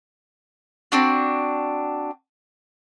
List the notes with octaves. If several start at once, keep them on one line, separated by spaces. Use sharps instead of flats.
C4 D4 F#4